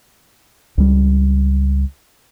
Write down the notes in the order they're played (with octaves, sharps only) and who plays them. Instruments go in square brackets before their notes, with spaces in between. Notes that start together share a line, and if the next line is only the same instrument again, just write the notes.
[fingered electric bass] C#2 G3